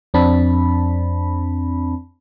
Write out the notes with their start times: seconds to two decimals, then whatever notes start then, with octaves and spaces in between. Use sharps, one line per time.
0.14 F2 C4 D4 A5 B5